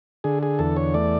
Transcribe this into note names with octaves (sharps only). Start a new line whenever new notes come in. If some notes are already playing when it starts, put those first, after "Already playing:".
D3 G#4
G#4
E2 A4
C#5
A3 D5